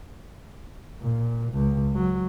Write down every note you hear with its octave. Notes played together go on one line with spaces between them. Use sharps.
A#2
C#2
F#3